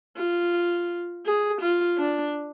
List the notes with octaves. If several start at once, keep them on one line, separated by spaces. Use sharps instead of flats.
F4
G#4
F4
D4